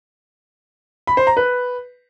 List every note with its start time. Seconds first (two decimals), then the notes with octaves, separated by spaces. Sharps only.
1.07 B5
1.17 C5
1.27 A#5
1.37 B4